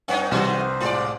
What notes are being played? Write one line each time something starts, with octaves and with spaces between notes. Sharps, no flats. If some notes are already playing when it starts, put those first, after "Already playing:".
G2 C4 C#4 D#4 F#5
C2 D#3 G#3 F#4 C5
A2 G#3 F4 D5